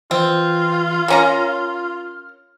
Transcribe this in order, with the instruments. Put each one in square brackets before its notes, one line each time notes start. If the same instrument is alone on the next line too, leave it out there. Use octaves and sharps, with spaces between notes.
[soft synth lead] E3 [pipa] C4 [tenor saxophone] F4
[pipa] A#3 C#4 A#5 [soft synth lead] F6